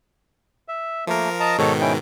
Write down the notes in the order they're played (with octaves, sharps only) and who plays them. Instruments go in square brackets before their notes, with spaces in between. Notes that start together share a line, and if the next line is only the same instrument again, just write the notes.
[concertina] E5
[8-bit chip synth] F3 A#4 [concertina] A3 A#3
[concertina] D#5 A5 A#5
[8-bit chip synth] G#2 B2 D#3 [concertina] A4 C#5
[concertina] C#4 E4 G5